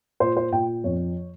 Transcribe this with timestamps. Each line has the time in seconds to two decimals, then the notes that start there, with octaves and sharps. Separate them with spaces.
0.20 A#2 C5
0.37 C5
0.52 A#2 G5
0.84 F2 C#5